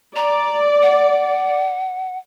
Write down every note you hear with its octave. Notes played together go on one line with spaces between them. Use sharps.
D5 A#5
F#5